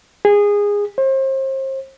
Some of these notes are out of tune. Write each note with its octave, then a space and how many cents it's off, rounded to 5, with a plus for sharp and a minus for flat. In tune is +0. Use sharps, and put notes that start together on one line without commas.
G#4 -20
C5 +35